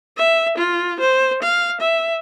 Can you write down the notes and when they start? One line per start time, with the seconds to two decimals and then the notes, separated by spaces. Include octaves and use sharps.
0.17 E5
0.58 F4
1.00 C5
1.43 F5
1.81 E5